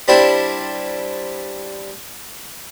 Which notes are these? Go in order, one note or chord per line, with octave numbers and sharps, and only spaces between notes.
G3 C4 D4 E4